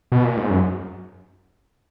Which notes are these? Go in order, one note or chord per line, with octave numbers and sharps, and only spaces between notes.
B2
A#2
G#2
F#2